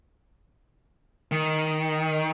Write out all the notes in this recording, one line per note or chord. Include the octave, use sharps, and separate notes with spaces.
D#3